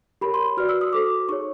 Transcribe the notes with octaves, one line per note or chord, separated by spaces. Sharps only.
G4 A#4 C#5 B5
C6
F#4 B4 D5 F6
E6
D#6
F#4 A4 C5 D6
D#4 G#4 C#5 C#6